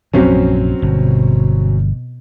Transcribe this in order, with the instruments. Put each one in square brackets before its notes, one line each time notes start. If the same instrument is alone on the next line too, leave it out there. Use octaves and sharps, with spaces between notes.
[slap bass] A#1 F#2 C3 [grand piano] F#3 C4 C#4
[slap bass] G1 [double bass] B2